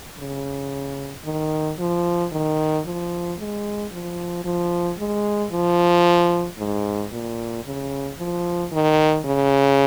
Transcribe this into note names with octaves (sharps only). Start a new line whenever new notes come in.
C#3
D#3
F3
D#3
F3
G#3
F3
F3
G#3
F3
G#2
A#2
C#3
F3
D#3
C#3